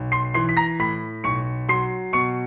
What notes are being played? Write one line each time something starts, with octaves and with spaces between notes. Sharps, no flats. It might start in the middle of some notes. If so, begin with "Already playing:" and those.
Already playing: B1
C6 C7
E3 C6 C7
B6
A#5 A#6
A2 B5 B6
B1 C#6 C#7
F#3 C6 C7
B2 C#6 C#7